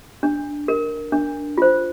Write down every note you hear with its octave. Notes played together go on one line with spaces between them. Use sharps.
D4
A#4
D4
F4 C5